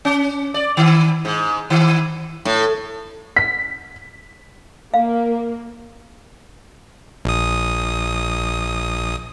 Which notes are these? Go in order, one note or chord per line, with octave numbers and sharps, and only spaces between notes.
C#4
D5
D#3
G#2
D#3
A2
B6
A#3 A#4 F5
A#1 D#6